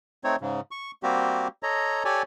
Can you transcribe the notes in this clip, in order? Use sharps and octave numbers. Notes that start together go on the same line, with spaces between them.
A3 C4 D#4 C#5
G#2 C#3
C#6
G3 A#3 C4 F#4 G4
A4 C#5 D#5 A#5
G4 A4 C#5 D5 G#5